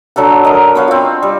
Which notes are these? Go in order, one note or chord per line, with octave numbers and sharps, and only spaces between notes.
D3 F#3 A4 A5
A#4 D#5
B3 C#5 F5
C4 F4
G3